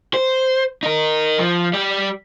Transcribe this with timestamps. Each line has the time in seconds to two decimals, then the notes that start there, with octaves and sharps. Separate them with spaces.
0.14 C5
0.83 D#4 A#4
1.39 F3
1.73 G3 G4